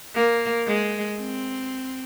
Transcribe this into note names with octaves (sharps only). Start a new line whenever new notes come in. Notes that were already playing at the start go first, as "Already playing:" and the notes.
A#3
G#3
C4